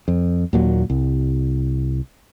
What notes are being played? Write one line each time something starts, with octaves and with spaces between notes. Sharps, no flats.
F2
D#2 A#2 F#3
C2